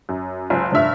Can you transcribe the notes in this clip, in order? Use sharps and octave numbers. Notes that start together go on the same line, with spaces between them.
F#2
F#1 C#2 G#5
F1 G2 E5 F6